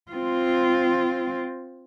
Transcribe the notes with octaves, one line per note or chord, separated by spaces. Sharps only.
C4 F4